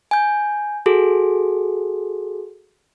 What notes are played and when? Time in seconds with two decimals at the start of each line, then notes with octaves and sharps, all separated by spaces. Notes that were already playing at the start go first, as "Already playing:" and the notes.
0.11 G#5 G6
0.86 F#4 G#4 A4